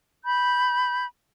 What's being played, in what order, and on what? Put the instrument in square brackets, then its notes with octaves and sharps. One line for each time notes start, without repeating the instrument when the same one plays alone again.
[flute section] B5 G6